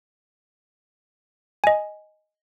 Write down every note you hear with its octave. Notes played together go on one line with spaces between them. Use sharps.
D#5 G#5